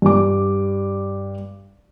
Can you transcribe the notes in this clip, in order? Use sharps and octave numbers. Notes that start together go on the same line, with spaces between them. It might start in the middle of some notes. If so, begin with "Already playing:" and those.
G2 D6